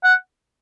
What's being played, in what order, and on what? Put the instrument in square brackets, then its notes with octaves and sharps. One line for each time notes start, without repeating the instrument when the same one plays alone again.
[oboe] F#5